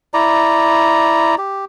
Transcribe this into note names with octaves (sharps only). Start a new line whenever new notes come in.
E4 D5 A#5
G4